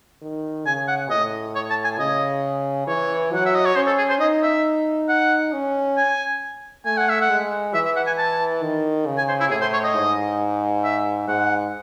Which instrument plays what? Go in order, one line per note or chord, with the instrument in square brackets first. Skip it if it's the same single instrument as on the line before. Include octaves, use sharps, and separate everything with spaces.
[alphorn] D#3
[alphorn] C#3 [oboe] G#5
[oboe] F#5
[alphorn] A2 [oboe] D#5
[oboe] C#5
A5
G#5
[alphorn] C#3 [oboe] D#5
[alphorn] E3 [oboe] C#5
[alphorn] F#3 [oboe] F#5
[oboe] E5
D#5
C#5
[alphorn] C#4 [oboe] C5
[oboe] A4
G#4
C5
[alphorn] D#4 [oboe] D#5
[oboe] E5
F#5
[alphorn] C#4
[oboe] G#5
[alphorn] A3 [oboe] G#5
[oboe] F#5
E5
F#5
[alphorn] G#3
[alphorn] E3 [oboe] E5
[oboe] E5
F#5
G#5
A5
[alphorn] D#3
C#3
[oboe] G#5
C5
E4
[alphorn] A2 [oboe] G#4
[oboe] C5
C#5
D#5
[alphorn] G#2
[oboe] E5
[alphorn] G#2 [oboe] F#5